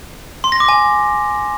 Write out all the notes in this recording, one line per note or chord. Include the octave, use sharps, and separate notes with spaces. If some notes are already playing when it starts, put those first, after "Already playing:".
C6
A#6
D6
G#5